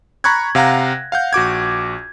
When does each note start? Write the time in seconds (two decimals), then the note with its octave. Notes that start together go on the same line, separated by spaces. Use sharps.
0.24 A#5 B5 C#6 F#6 G#6
0.55 C3 F5 F#5 A#5 A#6
1.12 F5 F#5 G6
1.33 A#1 F#4 D6 G#6